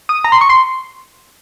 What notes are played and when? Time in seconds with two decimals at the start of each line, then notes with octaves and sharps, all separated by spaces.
0.09 D#6
0.24 A#5
0.32 C6
0.41 C#6
0.49 C6